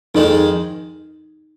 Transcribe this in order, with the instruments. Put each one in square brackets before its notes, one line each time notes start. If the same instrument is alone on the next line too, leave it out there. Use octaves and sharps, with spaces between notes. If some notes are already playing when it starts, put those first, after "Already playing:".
[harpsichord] F2 D#3 G#3 [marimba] D#4